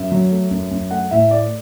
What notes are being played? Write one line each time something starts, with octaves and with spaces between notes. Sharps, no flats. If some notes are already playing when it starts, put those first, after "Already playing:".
Already playing: F#2 E5
F#3
A3
F#2
F#2
A3 F#5
A2 E5
A3 D5